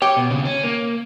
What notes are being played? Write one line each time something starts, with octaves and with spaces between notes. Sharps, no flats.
G4 C#5
B2
D#2 C#3
C#4
A#3